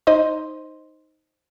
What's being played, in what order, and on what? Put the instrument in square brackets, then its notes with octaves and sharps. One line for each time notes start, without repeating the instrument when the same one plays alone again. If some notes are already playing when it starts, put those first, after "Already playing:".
[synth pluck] D#4 C5 D#5 C6